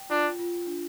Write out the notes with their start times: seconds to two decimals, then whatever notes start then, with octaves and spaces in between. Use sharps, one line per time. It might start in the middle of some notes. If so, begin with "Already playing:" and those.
Already playing: G5
0.10 D4 F4
0.39 F4
0.67 D4